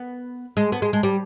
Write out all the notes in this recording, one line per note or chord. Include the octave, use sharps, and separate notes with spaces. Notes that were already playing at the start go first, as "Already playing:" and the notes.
Already playing: B3
G#3
B3
G#3
G#3
G3